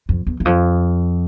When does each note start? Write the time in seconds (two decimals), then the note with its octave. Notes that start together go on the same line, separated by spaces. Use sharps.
0.09 F2
0.27 E2
0.40 E2
0.45 F2